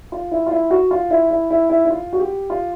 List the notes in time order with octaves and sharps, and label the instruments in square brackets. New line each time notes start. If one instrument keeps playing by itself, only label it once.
[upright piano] F4
E4
F4
E4
F#4
F4
E4
E4
E4
E4
E4
F4
F#4
G4
F4